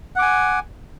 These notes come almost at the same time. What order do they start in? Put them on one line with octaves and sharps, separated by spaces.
F#5 D6 G#5